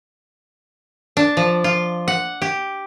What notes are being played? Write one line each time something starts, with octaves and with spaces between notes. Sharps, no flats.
D4
F3
F4
F#5
G4